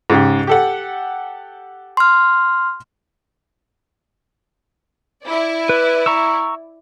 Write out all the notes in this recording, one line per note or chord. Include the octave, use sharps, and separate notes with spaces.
G#2 C#3 G4
G4 A4 F#5
C6 F6
E4 D5
B4
A#5 C#6 E6